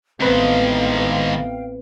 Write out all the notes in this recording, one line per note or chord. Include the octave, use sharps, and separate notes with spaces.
A1 G#2 D#3 B3 C4 B4 F5 G5